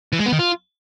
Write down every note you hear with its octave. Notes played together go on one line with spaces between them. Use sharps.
E3
G#3
B3
D#3
F4